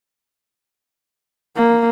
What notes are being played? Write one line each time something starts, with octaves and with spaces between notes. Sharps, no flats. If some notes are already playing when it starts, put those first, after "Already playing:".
A#3